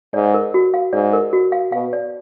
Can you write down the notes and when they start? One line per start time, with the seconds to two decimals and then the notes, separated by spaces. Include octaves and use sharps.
0.14 G#2 D5
0.34 A#4
0.54 F#4
0.74 F5
0.93 G#2 D5
1.13 A#4
1.33 F#4
1.52 F5
1.72 B2 F5
1.93 D5